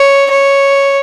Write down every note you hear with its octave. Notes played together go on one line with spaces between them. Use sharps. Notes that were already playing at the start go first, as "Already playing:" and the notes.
Already playing: C#5
C#5